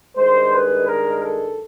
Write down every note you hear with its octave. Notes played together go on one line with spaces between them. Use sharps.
G2 D#3 G#3 C5
B4
A#4
A4